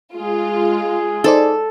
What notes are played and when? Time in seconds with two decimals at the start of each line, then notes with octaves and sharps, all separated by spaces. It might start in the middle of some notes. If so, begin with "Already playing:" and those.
0.14 G#3 F4 G#4
1.24 D#4 A4 C5 D5